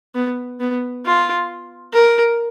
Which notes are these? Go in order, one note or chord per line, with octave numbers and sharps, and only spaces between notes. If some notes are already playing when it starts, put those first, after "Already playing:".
B3
B3
F4
A#4